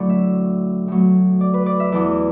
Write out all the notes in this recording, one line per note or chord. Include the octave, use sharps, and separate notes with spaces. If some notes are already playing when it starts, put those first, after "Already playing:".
Already playing: A2 D3 F#3 D5
E5
A2 F#3
D5
B4
D5
E5
E2 E3 D5